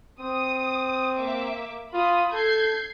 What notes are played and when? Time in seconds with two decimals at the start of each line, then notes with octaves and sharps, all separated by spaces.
0.20 C4 D#6
1.18 A#3 E5 D6
1.93 F4 B5 D#6
2.32 A4 G6 G#6 C7